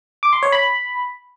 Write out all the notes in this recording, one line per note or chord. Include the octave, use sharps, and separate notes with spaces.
D6
C6
C#5
B5